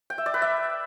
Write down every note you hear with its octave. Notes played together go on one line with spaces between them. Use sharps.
G5
E5
D5
B4
E5